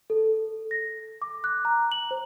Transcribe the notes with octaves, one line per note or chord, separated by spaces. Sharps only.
A4
A#6
D6
F#6
A#5
F#7
C5